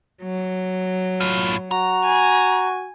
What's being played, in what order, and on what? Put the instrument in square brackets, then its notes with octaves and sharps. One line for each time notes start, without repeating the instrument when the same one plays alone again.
[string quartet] F#3
[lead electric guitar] A2 F4
[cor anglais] F#4 [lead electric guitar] A#5
[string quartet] G#5